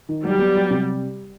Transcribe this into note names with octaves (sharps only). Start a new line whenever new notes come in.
D#3
F#3 G3
B3
F#3
C3